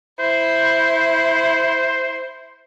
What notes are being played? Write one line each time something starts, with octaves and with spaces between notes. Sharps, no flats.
E4 C5